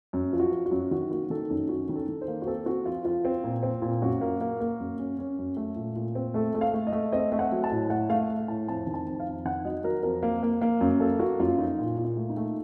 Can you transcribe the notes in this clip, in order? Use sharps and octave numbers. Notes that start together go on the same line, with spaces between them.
F#2
F3
F#4
F3
F#4
F#2
D#3 F#4
A#3 F#4
D#3 A4
F#2 D#4
C#4 F#4
D#3
A4
D#3
C5
A#3
F#4
C4 A4
C4 F#4
F3 F4
F3 F4
C4
A#2
C4
A#2
F#2 F#4
A#3
A#3
A#3
F#2
C#4
C#4
F#2
A3
A#2
A#2
C4
A3 A4
A3
F5
A3
D#5
A3
C4 D#5
A3
F#5
F#3
A5
A2
A3 F#5
A3 F5
A3
A2 A5
F2 A5
D#3
A5
F2
F5
F2
D#3 F#5
F#3 D#5
F#3 A#4
F2 A#4
A#3
A#3
A#3
F#2
A#3 A4
A#3 F#4
F#2 F4
F3 D#4
A#2 F4
A#2
F4
A3
D#4
A3